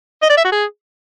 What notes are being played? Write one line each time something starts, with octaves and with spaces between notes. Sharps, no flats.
D#5
D5
E5
F#4
G#4